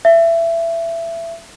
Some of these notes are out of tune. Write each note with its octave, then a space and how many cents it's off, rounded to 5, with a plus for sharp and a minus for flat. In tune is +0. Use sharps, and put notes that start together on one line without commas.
E5 +20